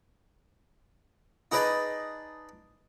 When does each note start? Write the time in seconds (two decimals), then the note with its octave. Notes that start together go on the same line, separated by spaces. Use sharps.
1.52 D#4 G#4 B4 D5 D#5 A5